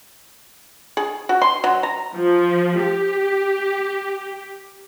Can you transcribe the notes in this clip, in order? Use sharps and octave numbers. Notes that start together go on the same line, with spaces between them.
G#4
F#4
C6
F#3
A#5
F3
G4